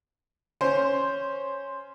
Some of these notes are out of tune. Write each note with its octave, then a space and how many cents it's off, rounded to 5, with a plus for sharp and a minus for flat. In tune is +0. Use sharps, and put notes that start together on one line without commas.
C#4 +0 C5 +0